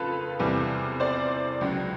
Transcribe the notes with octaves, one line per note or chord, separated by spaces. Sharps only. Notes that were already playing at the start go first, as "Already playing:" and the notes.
Already playing: F2 C#3 F4 A4 B4
E2 C3 E3 G3
C5 D5
C#2 C#3 F#3